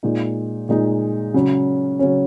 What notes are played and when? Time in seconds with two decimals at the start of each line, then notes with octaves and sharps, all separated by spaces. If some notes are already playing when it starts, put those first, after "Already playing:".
0.03 A#2 G#3 D#4
0.69 A#2 G#3 D#4
1.34 C#3 F#3 C#4
1.99 C#3 F#3 C#4